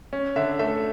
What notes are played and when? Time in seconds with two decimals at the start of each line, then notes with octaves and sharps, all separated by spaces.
0.13 C#4
0.36 D3 E5
0.59 A3 E5